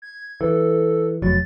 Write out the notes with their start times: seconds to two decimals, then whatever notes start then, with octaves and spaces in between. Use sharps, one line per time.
0.02 G#6
0.41 E3 A4
1.22 F1 F#3 A6